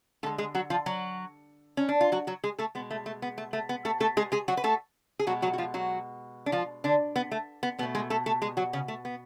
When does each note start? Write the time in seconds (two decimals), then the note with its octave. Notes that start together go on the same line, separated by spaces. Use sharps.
0.23 D3 A3 A4
0.26 G#3
0.38 G#3 G#4
0.55 F#3 F#4
0.70 F3 F4
0.86 F#3 F#4
1.77 C#4
1.89 D4
2.01 F4
2.12 F#3 F#4
2.27 F#3 F#4
2.44 G#3 G#4
2.59 A3 A4
2.75 B2 G#3 B3
2.91 A3
3.06 A3
3.22 B3
3.38 A3
3.53 A3
3.69 B3
3.85 A3 A4
4.00 A3 A4
4.17 G#3 G#4
4.32 G#3 G#4
4.48 F#3 F#4
4.57 B4
4.64 A3 A4
5.19 G#4
5.27 B2 F#3 G#3 F#4
5.42 F#3 F#4
5.53 F#4
5.58 F3 F4
5.74 F#3 F#4
6.46 D4
6.52 F3 F4
6.84 D3 D4
7.16 B3
7.32 A3
7.63 B3
7.79 B2 B3
7.83 A3
7.95 G#3 G#4
8.10 A3 A4
8.26 A3 A4
8.42 G#3 G#4
8.57 F#3 F#4
8.73 C#3 C#4
8.88 A3
9.05 B3